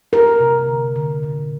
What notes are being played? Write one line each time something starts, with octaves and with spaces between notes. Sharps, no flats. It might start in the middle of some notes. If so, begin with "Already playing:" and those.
A#3 A#4
C3
D3
D3
A#2